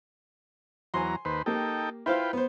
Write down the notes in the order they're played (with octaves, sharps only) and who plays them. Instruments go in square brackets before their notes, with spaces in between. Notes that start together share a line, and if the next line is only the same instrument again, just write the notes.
[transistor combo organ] E2 F#3 A#5 [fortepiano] G#5 C6
[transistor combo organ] D#2 B4 C5
[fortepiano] A#3 G4 [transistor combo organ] D#4 A4 G5
[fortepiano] E4 C5 F5 [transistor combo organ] F4 B4 G5
[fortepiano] B3 C5